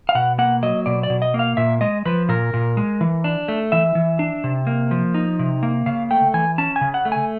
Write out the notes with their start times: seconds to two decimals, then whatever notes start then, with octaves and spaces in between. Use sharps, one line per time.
0.09 F5
0.15 B2 F#5
0.38 A#3 F#5
0.63 F#3 D#5
0.86 B2 D5
1.03 D5
1.10 B2
1.22 D#5
1.34 A#3
1.39 F5
1.57 A#2 E5
1.81 G#3 D#5
2.05 F3 B4
2.29 A#2 A#4
2.53 A#2
2.77 G#3
3.01 E3
3.24 D4
3.48 A3
3.72 E3 E5
3.95 E3
4.19 D4
4.44 C3
4.67 A#3
4.91 F3
5.14 D#4
5.39 C3
5.63 A#3
5.86 C#3 F5
6.11 A3 G5
6.34 E3 G#5
6.58 C#4 A5
6.76 G#5
6.81 C#3
6.94 F#5
7.05 A3
7.12 G#5